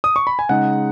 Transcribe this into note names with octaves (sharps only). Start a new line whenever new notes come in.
D#6
C#6
B5
G#5
C#3 G#3 D#4 F#5